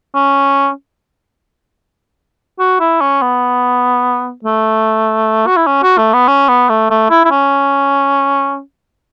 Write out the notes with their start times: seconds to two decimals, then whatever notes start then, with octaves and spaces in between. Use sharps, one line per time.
0.15 C#4
2.59 F#4
2.80 E4
3.01 C#4
3.22 B3
4.44 A3
5.47 F#4
5.56 E4
5.67 C#4
5.83 F#4
5.98 A3
6.13 B3
6.28 C#4
6.49 B3
6.70 A3
6.90 A3
7.10 E4
7.25 E4
7.31 C#4